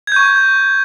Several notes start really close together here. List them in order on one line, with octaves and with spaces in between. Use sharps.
G#6 G6 C#6